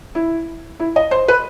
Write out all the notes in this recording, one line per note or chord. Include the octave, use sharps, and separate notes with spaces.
E4
E4
D#5
C5
B4